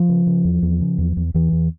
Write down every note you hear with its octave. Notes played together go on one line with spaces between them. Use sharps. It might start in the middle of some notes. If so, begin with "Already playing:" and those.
Already playing: F3
C#3
C#3
E2
E2
C#3
E2
E2
E2 E3
E2